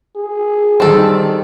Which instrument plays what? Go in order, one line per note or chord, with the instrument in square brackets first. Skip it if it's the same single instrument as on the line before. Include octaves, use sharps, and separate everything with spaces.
[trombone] G#4
[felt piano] D#3 G3 [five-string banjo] C4 A4